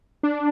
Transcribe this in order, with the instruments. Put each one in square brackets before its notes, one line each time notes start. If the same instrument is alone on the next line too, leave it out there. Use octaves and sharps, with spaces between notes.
[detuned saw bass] D4